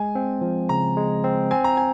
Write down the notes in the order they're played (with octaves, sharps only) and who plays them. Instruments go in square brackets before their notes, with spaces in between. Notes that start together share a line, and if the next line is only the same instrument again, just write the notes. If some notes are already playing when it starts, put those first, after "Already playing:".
Already playing: [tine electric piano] G#3 [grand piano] G#5
[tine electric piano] C4
F3
[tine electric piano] C#3 [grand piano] A#5
[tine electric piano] G#3
C4
[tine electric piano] C4 [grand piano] G#5
[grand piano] A#5
G#5